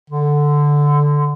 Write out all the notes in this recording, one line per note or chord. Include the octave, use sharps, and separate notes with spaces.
D3